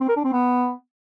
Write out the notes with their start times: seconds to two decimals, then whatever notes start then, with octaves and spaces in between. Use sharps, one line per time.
0.01 C4
0.09 A#4
0.17 D4
0.25 C4
0.32 B3